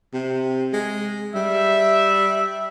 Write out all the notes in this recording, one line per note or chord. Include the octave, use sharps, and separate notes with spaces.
C3
G#3
G3 E5